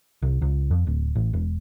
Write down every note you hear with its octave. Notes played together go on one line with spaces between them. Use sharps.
C2
C#2
F2
D1
A1
E1